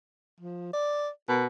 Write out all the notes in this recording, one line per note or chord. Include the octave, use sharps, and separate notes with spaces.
F3
D5
B2 A#4